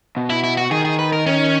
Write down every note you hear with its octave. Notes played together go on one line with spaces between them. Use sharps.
B2
E4
E4
F#4
D#3 G#4
G#4
B4
A#4
C#4